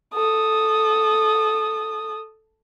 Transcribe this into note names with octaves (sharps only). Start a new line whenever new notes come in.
A4 D#6